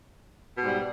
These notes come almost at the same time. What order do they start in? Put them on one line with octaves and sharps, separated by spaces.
B2 G#2 G3